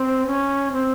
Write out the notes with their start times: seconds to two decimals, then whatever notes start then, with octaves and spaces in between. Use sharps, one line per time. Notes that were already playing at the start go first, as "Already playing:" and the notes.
Already playing: C4
0.27 C#4
0.72 C4